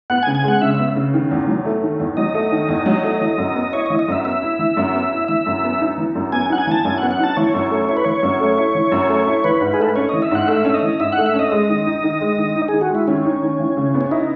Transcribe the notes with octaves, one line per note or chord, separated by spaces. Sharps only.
B3 F#5
G#5
C#3
G#5
G#3 F#5
C#3 E5
B3 E5
C#3
D#3
E2
F#3
A3
D#3
E2
F#3 D#5
A3
D#3
E2
F#3
A3
E3
F#2
B3
E4 C#5
E3 D#5
D#5
F#2 E5
B3 E5
E4
E3
F#2
B3
E4
E3 E5
F#2
B3
D#4
E3
F#2
B3 G#5
D#4 F#5
G#5
E3 A5
F#2 G#5
F#5
B3
F#5
D#4 A5
E3 C#5
F#2
A3
E4 C#5
B4
E3 C#5
F#2
A3
E4
E3
F#2
A3
E4
E3 B4
G#2
G#4
A3 A4
B4
C#4 C#5
E3 D#5
E5
G#2 F#5
A3 E5
C#4
D#5
E3
G#2 E5
F#5
A3
E5
C#4
D#5
G#3
D#3
D#4
D#3
G#3
D#3
D#4
D#3 G#4
F#4
G#3
E4
D#3 C#4
D#4
D#3
E3
C#3
B3
C#4
D#4 E4